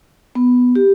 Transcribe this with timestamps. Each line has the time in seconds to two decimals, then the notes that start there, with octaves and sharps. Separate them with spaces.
0.35 B3
0.75 G4